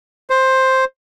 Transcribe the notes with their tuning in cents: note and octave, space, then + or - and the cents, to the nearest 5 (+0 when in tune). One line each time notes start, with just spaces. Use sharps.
C5 +5